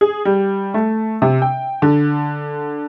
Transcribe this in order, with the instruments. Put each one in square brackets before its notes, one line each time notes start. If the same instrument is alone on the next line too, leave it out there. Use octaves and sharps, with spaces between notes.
[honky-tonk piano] G#4
G3
A3
C3
G5
D3